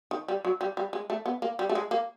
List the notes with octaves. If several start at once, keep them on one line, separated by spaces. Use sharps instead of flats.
D#3
G3
F#3
G3
G3
G#3
A3
B3
A#3
G3
A3
G#3
A#3